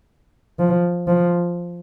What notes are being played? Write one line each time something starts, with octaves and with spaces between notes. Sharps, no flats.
F3
F3